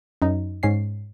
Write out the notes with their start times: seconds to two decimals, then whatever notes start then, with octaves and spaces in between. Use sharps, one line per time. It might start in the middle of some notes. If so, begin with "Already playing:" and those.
0.22 F#2 D#4
0.63 G#2 C#4 C7